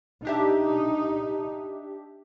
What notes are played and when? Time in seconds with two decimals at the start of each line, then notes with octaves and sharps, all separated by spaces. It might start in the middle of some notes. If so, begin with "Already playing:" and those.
0.25 D4 D#4 G4 E5